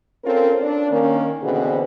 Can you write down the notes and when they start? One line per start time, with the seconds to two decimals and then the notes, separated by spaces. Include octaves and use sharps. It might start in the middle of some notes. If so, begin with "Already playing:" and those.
0.24 C4 C#4 F4 A4 A#4
0.62 D4
0.91 D#3 A#3 C#4
1.42 B2 D3 E3 C4 F#4 G#4